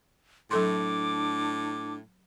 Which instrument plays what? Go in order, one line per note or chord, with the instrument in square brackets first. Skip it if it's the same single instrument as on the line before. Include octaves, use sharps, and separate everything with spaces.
[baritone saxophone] A2 [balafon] F#3 A4 C6 [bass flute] D4 [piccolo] D6